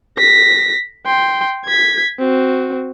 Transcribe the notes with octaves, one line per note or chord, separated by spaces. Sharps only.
A#6 B6
G5 C6
G#6 B6
C4 F#4